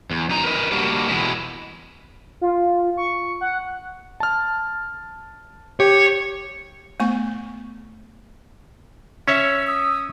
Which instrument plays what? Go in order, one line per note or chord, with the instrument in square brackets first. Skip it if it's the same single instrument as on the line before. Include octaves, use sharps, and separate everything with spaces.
[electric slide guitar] E2
F#2 D#4 A#5
A#4 B4 D#5
G3 A#3 D4 F#4
E2 B2 G#3 B3 E4
[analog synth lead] F4
C#6
F#5
[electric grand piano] A5 F6
[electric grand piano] G4 [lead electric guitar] C#5
[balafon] A3 B3 C#6
[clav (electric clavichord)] C#4 C#5 E5 [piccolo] E6
[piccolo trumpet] D#6 [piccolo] E6